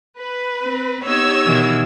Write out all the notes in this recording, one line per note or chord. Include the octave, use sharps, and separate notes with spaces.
B4
C4
B3 D#4 G4 C#5 E6 G#6
B2 D#3 E3